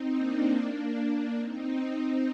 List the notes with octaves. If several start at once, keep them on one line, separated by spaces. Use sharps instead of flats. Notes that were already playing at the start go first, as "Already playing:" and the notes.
Already playing: C4 D#4
A#3 D4
C4 D#4